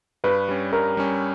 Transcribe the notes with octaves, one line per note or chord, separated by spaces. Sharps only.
G2 B4
G3 C#4
G2 A#4
G3 C#4